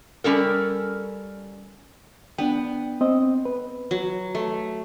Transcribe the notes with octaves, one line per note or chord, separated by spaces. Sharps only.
G3 C#4 A4 A#4
B3 D4 G5
C4 D#5
B4
F#3
A3